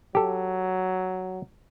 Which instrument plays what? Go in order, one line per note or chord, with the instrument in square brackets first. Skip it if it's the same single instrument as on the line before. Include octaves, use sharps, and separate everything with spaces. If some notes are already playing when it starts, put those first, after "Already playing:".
[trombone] F#3 [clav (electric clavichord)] G4 A4